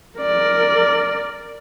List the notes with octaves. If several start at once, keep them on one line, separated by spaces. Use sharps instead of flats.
A#4 D5